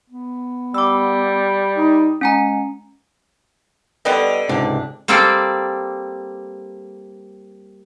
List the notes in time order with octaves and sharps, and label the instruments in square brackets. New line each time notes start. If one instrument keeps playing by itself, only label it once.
[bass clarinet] B3
[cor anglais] G3 [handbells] D6 E6
[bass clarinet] D#4
[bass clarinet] G#3 [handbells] C#4 G#5 A#5
[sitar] D3 [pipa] G3 B3 D#5
[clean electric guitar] C#2 G#2 C3 [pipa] D4
[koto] G3 A#3 C4 A4 D5